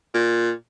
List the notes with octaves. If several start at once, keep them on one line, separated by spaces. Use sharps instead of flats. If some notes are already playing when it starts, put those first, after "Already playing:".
A#2